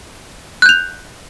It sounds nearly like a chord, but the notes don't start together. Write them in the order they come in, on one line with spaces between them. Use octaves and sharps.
F#6 G6 F7